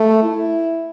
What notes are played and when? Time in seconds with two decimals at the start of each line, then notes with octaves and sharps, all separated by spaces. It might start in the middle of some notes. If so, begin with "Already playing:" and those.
Already playing: A3
0.23 E4